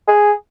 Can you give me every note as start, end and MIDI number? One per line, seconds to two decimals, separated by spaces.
0.08 0.32 68